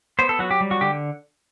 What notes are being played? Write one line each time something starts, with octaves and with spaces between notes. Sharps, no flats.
B3 C5
A4
F#3 F#4
G4
G3
F#4
D3 G4